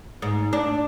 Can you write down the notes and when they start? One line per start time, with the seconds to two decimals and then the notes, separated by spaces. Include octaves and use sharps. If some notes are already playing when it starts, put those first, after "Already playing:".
0.22 G#2
0.53 D4